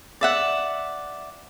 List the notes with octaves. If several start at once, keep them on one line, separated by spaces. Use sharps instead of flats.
D5 E5 F#5